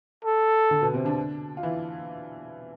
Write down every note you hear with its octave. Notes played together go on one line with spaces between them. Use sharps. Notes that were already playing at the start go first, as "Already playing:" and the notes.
A4
D3 D4
B2 B3
C3 C4
D3 D4
F4
E3 E4